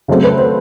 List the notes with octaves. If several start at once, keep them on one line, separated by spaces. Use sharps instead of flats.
C#3 F#3 A3 C4
B4
C5